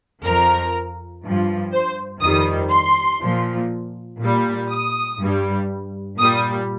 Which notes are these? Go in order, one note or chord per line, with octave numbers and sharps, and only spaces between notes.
F2 F3 A#4
G2
F3
C5
F2 D#3 G3 D#6
C6
A#2 F3
A#2 G3
D#6
G2 G3
A#2 G3 D#6